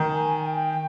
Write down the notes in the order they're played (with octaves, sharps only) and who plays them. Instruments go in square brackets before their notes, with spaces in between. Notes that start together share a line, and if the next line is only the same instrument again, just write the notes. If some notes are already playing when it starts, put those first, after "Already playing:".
Already playing: [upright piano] D#3
[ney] G#5
G5